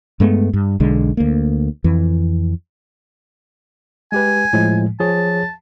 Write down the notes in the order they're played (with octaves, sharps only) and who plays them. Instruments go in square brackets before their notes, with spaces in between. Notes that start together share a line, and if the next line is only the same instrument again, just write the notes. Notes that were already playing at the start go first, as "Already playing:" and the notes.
[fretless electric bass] G2 G#3 A3 B3
G2
B1 D3 G#3
D2 A#3
F2 E3
[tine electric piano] G#3 G4 B4 [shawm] G#5
[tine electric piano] A2 F3 G#3
[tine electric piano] F3 G#4 C#5 [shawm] A5